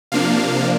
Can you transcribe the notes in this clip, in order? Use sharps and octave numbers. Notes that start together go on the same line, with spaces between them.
C3 F3 A#3 D4 F5